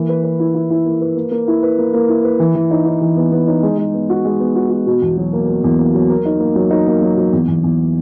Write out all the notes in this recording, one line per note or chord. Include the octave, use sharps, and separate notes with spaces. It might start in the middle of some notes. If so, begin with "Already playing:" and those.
Already playing: E3 A#3
B4
B4
E4
E4
E4
A#3
B4
A#3
A#3
E4
B4
A#3
A#3
E4
B4
E3
E3
D#4
D#4
E3
B3
B3
D#4
G#3
G#3
B3
F#4
G#3
B3
F#4
F#4
B2
E2
F#3
A#3
A#3
E2
A#3
F#3
A#4
D#4
A#3
F#3
D#4
A#3
F#3
F#3
E2
E2
E2